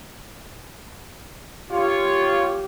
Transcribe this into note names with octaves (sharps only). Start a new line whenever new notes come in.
F4 G4 C#5